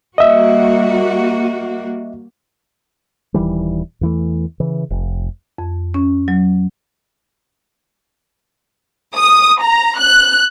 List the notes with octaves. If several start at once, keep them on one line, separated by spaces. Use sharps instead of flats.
G3 A#3 F#4 D#5 E5
D#1 D#3 E3 G3
E2 E3 A3
C#3 E3
F1
F2
C#4
F#3
D#6
A#5
F#6